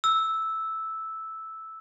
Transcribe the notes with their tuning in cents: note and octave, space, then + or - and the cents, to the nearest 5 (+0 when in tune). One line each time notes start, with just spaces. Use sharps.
E6 -5